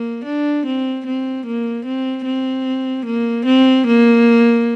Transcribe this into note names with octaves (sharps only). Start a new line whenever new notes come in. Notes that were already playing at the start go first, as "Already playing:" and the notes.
Already playing: A#3
D4
C4
C4
A#3
C4
C4
A#3
C4
A#3